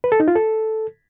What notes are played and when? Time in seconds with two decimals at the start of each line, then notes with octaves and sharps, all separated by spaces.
0.04 B4
0.12 A4
0.20 D#4
0.28 F4
0.35 A4